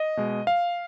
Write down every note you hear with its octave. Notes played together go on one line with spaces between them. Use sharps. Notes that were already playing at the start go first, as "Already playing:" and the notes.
Already playing: D#5
B2 G#3
F5